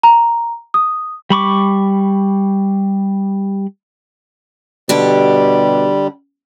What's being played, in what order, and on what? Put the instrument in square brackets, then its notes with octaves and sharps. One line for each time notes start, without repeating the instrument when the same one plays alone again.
[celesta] A#5
D#6
[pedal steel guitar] G3 B5 C#6 D6
[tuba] B2 [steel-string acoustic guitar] D3 G4 [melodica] G3